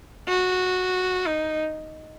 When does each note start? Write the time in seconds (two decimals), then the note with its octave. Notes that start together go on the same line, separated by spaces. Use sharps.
0.27 F#4
1.25 D#4